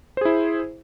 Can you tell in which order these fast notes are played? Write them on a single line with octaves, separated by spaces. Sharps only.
C5 G#4 E4